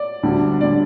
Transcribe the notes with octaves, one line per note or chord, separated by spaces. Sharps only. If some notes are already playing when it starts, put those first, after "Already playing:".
Already playing: D5
D2 D3 G3
D3 G3 D5